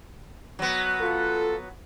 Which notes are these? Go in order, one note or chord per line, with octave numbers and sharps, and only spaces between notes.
F#3 B3
F4 A4